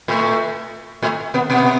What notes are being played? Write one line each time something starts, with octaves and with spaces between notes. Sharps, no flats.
A2 A3
A2 A3
B2 B3
B2 B3